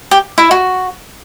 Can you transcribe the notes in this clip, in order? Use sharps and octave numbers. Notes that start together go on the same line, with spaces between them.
G4
E4
F#4